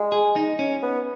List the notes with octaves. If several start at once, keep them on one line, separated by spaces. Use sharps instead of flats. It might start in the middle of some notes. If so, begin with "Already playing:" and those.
Already playing: G#3
G#4
D#4
C#4
B3